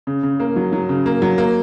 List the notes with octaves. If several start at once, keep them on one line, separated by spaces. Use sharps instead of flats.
C#3
C#3
A#3
F#3
F#3
C#3
A#3
F#3
A#3